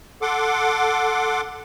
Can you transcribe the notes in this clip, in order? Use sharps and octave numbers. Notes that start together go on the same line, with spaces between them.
A4 F#5 C6 D6